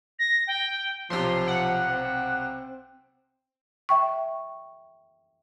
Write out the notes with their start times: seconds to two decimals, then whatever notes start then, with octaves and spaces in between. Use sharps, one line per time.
0.19 A#6
0.47 G5
1.10 B1 C3 F3 C6
1.47 F#5
1.89 C4
3.89 E5 G5 C#6